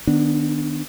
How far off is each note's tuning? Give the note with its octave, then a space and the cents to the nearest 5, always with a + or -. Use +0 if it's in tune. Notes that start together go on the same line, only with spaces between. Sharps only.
D#3 -20 B3 +0 D4 +0